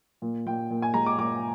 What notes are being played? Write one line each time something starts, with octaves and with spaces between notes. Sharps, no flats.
A#2
A#2 G5
A#2
G#5
G#3 A#5
D6
A#2 D6